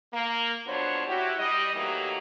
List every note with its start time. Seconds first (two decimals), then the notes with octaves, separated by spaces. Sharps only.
0.13 A#3
0.66 F2 F#3 B3 D4 C5 C#5
1.07 E4 F#4 G4
1.39 G3 D#5
1.74 E3 F#3 A3 A#3 D#4 G4